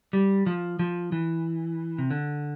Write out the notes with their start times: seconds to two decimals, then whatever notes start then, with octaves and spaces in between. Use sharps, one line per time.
0.13 G3
0.46 F3
0.79 F3
1.12 E3
1.98 C3
2.11 D3